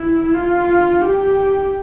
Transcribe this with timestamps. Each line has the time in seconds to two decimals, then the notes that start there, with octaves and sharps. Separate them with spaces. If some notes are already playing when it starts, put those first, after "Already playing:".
Already playing: E4
0.34 F4
1.01 G4